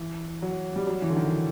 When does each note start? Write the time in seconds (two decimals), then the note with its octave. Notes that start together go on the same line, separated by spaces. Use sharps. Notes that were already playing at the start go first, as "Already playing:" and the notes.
Already playing: E3
0.42 F#3
0.76 G3
0.87 F#3
1.02 E3
1.10 D3
1.17 D#3